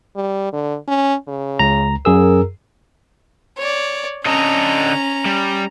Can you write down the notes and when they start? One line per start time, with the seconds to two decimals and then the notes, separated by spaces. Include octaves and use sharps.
0.16 G3
0.53 D3
0.88 C#4
1.28 C#3
1.59 C#2 A#5
2.05 F#2 G#4 A#4 E6
3.58 C#5 D5
4.26 D3 C#4 A4 D#5 A#5
5.25 G3